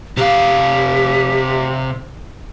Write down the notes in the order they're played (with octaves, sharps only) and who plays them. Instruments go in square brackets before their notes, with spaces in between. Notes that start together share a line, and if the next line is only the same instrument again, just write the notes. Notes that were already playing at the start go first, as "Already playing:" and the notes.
[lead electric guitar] C3 F5 [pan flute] G4